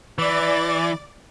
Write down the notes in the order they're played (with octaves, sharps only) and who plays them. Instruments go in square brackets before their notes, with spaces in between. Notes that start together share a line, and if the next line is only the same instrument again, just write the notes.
[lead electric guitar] E3 [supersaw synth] D5 D6 A6